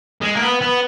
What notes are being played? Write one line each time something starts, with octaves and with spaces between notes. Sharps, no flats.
G#3
A#3
B3
B3